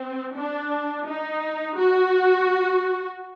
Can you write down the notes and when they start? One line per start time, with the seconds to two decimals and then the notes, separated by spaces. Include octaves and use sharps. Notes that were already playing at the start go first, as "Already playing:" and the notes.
Already playing: C4
0.36 D4
1.06 D#4
1.77 F#4